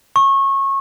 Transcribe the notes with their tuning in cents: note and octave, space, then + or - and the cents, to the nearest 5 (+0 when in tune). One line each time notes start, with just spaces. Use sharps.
C#6 -25